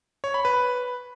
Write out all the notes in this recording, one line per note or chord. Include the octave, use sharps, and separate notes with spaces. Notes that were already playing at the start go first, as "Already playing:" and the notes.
C#5
B5
B4